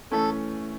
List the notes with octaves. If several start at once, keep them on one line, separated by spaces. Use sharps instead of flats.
E3 A3 C#4 A4